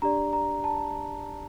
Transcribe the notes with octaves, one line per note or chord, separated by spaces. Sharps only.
D4 G4 D5 A#5
A#5
A5